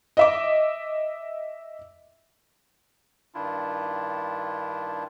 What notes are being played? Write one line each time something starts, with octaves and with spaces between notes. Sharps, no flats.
D#5 E5 D6
G2 D#3 D4 E4 F4